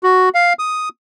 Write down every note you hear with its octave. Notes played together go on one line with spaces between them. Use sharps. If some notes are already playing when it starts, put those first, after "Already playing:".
F#4
F5
D#6